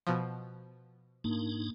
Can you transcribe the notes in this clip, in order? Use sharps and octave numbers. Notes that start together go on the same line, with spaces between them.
B2 F3
G#2 A#3 D4 D#4